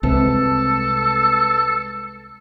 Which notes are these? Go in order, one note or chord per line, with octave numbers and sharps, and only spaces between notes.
C2 C3 G#3 A4 B4 A5